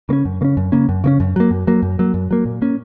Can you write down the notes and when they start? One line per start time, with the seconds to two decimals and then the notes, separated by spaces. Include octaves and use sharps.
0.09 C#3 A#3
0.13 C#4
0.25 F#2
0.41 C#3 A#3
0.45 C#4
0.57 F#2
0.72 C#3 A#3 C#4
0.89 F#2
1.04 C#3 A#3 C#4
1.20 F#2
1.36 F#3 A#3
1.51 F#2
1.67 F#3 A#3
1.82 F#2
1.99 F#3 A#3
2.14 F#2
2.31 F#3 A#3
2.45 A#2
2.62 A#3 C#4